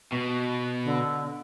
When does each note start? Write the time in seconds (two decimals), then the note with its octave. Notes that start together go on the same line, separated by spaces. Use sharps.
0.13 B2
0.85 D3